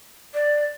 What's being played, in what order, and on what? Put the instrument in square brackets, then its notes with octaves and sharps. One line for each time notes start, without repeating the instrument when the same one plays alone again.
[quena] D5